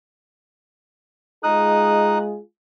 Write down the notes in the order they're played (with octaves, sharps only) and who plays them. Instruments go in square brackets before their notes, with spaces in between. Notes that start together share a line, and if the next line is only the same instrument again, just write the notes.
[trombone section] G#3 F4 G#4 [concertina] D#4 D#6 F#6